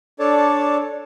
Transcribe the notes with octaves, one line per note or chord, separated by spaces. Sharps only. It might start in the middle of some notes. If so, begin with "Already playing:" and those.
D4 A4 C#5 D5 A5